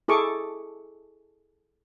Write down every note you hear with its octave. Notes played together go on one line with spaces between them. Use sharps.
E4 G#4 A4 C#6 D6